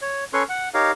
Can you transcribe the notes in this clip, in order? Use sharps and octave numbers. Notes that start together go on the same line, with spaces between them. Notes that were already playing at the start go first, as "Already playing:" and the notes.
C#5
C#4 A4 B4 C#5 C6 C#6
F#5
D#4 G4 A#4 C#5 F5